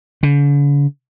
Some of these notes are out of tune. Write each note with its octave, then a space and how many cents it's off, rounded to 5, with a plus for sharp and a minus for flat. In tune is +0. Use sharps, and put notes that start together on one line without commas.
D3 -45